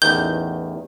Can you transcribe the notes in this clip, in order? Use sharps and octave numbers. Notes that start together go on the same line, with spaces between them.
A1 E2 D#3 G6 G7